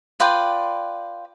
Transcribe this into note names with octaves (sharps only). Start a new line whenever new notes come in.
F4 B4 D5 G5